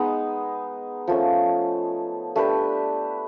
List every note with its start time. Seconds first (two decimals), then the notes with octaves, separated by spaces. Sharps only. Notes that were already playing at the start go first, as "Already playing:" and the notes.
Already playing: G#3 B3 D#4
1.07 F3 A3 C#4
2.36 A3 D4 G4 B4